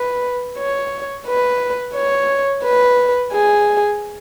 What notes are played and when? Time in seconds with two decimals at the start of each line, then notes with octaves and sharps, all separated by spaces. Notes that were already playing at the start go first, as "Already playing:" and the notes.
Already playing: B4
0.58 C#5
1.26 B4
1.94 C#5
2.64 B4
3.33 G#4